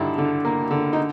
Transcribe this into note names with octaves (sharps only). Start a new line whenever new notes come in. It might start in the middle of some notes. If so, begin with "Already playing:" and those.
Already playing: G2 D3 D#4 E4
D3
A#3
D3
D#4